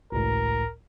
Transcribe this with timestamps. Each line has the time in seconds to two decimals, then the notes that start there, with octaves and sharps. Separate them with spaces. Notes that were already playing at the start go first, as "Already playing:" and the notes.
0.12 G#1 C#2 A2 A#4